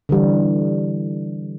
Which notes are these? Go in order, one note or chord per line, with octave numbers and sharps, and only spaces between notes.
D3 E3 G3